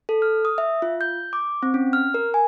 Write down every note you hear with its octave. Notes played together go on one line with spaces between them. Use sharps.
A4
F6
D#6
E5
F4
G6
D6
C4
C#4
F6
A#4
G#5